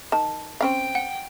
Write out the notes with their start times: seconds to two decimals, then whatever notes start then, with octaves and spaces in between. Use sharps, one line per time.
0.12 D#3 A5
0.61 C4 C#4 F5 G5
0.95 F#5